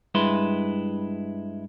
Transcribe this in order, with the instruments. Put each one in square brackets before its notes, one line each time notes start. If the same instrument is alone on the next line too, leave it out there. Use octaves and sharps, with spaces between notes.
[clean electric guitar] G2 G#3 E4 B4 C6